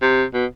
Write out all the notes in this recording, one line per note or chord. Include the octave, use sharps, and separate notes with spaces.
C3
B2